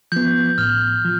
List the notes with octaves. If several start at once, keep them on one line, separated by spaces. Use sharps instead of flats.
F3 B3 G6
A2 F6
F3